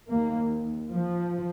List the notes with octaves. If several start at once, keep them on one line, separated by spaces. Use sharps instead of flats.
D#2 A#3
F3